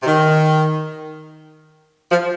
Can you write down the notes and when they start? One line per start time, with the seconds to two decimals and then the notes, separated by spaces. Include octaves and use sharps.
0.01 C3
0.05 D#3
2.10 F3